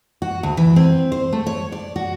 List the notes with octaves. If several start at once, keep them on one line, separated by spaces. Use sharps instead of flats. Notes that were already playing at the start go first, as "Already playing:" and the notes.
F#4
D2
E3
C4
C5
A3
C#5
D5
F#4